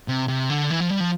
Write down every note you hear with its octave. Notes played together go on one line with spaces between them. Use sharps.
C3
C3
D3
E3
F3
G3
F3